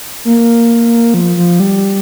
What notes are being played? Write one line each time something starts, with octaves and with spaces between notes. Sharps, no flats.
A#3
F3
F3
G3